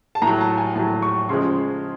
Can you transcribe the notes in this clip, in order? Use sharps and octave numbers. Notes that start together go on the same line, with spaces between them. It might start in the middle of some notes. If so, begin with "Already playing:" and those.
A5
A2 A#5
F#3
A5
G#5
A2 F#3 A5
C#6
C#3 F3 G#3 C6